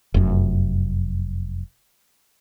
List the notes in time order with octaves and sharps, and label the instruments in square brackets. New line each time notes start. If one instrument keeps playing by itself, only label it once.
[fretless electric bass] F1 F#2